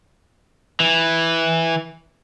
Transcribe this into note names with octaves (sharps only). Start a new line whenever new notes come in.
E3